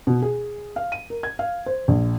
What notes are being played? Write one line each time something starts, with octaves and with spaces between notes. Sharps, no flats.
B2
G#4
F5
D#7
A#4
G#6
F5
C5
A#1